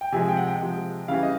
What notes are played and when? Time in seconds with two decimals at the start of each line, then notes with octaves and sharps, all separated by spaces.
0.01 G5
0.12 C3 F3 G#3 G#5
0.28 G5
0.37 F#5
0.45 G5
0.61 C3 F3 G#3
1.08 C#3 E3 G3 F5
1.23 D#5